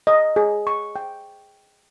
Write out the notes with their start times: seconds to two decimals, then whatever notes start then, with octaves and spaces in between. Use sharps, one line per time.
0.07 D#5
0.36 G#4
0.67 C#6
0.96 G5